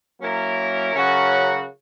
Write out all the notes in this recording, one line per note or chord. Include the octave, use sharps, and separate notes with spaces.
F#3 A#3 C#4 E4 A#4
C#3 F#3 C#4 F#4 A#4